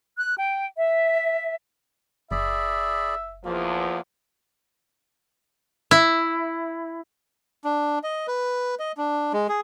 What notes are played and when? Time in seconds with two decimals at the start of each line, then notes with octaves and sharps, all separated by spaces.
0.18 F#6
0.37 G5
0.77 E5
2.31 F#1 G#4 D5 E5 B5
3.45 E2 F3 A#3
5.91 E4
7.64 D4
8.04 D#5
8.28 B4
8.79 D#5
8.97 D4
9.33 G#3
9.49 G#4